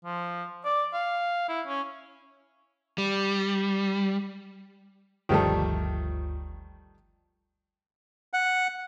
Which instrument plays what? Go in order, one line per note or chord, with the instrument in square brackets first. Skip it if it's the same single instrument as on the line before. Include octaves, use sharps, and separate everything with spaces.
[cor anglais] F3
D5
F5
E4
C#4
[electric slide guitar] G3
[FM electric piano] G1 D2 F3 [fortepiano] D#3 G3 A3
[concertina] F#5